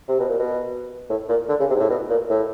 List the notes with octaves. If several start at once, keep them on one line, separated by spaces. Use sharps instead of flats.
C3
B2
A#2
B2
A2
A#2
D3
C#3
C3
G#2
A2
B2
A#2
A2